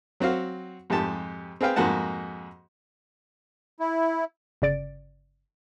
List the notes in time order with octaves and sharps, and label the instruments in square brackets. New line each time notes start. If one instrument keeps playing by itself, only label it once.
[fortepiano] F#3 C4 F#4 F5
F2 G#2 G4 A5
C4 G#4 B4 F5 G5
F2 G#2 A#3 F#4 F#5 A5
[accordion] E4
[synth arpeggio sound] G1 C#3 D5 A6 D7